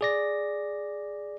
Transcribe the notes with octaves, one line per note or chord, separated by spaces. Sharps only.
G#4 D5 A#6